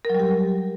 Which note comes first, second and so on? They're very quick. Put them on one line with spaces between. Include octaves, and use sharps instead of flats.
A#4 F#3 G3 G4